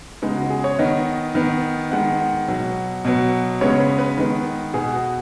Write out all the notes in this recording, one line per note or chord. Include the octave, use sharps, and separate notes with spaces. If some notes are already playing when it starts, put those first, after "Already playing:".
C#3 G#3 B3 D#4
F#4
G#4
C#5
D#3 B3 D#5
D#3 B3
D#3 G#3 B3 F#5
F#5
B2 F#3 B3
B2 F#3 B3
C#3 G#3 B3 C#5
B4
B4
D#3 G#3 B3
B2 B3 G#4
F#4